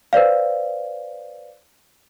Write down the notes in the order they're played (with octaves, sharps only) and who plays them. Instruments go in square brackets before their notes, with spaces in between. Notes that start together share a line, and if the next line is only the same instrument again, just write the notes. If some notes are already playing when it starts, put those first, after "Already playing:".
[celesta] B4 C5 D5 F5